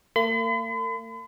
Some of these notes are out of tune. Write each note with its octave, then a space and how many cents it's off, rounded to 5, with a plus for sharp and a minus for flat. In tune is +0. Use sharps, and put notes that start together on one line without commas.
A#3 -45 B5 +45